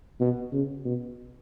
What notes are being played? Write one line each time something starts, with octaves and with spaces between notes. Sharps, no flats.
B2
C#3
B2